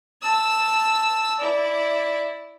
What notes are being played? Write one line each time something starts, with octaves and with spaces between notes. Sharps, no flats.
A5 E6
E4 D5